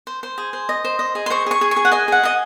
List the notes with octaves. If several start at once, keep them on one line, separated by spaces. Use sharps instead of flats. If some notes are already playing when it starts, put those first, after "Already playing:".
C5
C5
G#4
C5
D#5
C5
D#5
G#4
C6
C5 C#6
G#4 C#6
G#4
C#6
G#4
F#5
D#5 G#5
G#4 F#5
G#4 D#5